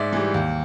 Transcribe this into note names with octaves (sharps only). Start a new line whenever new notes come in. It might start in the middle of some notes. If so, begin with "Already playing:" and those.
Already playing: G#2 D5 E5
E3 G3
D#2